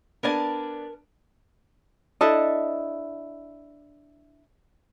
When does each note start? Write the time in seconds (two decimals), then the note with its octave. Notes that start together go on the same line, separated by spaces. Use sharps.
0.23 B3 D4 A#4 D5 G#5 A5
2.21 D4 E4 A4 D#5